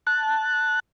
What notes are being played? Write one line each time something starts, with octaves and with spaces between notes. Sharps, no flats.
A5 F#6